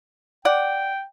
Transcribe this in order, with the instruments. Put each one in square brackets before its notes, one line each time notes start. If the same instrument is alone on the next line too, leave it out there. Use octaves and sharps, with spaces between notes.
[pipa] D5 F#5 [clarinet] G5